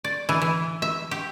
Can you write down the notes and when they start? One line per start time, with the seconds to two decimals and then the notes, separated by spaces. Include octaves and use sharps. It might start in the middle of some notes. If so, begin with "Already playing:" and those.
0.04 D5
0.29 E3
0.42 E3
0.82 E5
1.11 G4